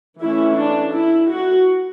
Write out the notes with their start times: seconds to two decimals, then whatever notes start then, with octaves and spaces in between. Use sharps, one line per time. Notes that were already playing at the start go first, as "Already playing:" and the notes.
0.20 E3 A3 C#4 E4
0.57 D4
0.93 E4
1.30 F#4